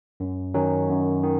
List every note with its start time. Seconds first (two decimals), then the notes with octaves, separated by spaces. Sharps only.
0.20 F#2
0.54 D#3 F#3 C#4
0.89 F#2
1.23 D#3